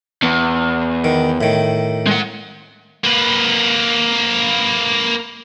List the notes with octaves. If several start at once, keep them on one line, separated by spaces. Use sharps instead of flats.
E2
D#3
A2 D#3
G#3 F#5
A#3 B4